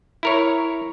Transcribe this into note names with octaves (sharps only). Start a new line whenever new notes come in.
E4 A#4 C#5